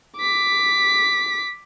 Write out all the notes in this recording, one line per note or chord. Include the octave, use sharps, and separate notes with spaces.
D6 B6